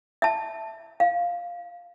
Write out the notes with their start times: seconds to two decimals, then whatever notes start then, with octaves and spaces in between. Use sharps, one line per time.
0.22 E5 A5
1.00 F5